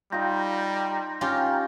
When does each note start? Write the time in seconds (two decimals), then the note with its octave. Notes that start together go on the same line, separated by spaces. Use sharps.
0.12 G3 D#4 F4 G5 A#5
1.21 C#4 F4 G4